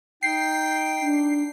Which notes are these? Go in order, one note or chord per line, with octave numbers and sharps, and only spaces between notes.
D#4 G5 C7
D4